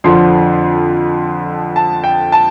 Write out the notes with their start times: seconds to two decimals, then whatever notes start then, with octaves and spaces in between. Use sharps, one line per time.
0.04 F2 D3 F3 C6
1.76 A5
2.04 G5
2.32 A5